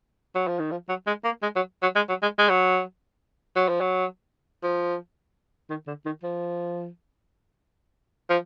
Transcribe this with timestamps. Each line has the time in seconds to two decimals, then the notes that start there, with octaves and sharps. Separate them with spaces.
0.35 F#3
0.47 F3
0.59 D#3
0.71 F3
0.89 F#3
1.07 G#3
1.24 A#3
1.43 G#3
1.56 F#3
1.82 F#3
1.96 G#3
2.09 F#3
2.23 G#3
2.38 G#3
2.49 F#3
3.56 F#3
3.69 F3
3.81 F#3
4.63 F3
5.70 D#3
5.87 D3
6.06 D#3
6.23 F3
8.30 F3